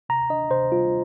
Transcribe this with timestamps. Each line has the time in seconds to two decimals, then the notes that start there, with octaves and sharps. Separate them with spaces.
0.09 C3 A#5
0.30 D4 D#5
0.51 C3 C5
0.71 G3 F4